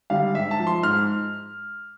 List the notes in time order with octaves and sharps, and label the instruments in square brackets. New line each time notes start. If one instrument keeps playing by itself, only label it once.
[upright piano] D3 G3 F5
G#2 E5
A5
F3
C6
G#2 F6